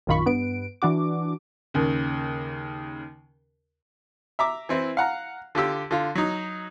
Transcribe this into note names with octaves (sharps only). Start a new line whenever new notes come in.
A#1 F#2 D#3 F4 B5 C#6
G2 B3 B4 D7
E3 D4 F#4 D6
D#2 C#3
E5 A#5 D6
E3 C4 E4
F5 F#5 A#5
D3 F4 G4 E6
D3 F4
F#3 D#4